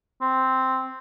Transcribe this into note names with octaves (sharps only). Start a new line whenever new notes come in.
C4